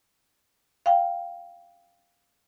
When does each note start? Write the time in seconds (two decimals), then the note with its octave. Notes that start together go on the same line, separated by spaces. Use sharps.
0.86 F5 G5